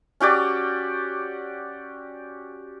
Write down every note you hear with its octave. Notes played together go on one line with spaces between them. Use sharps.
C#4 F#4 G4 D5